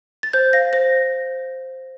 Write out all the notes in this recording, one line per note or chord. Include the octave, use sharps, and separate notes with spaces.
A6
C5 G6
F5 A#6
C5 A#6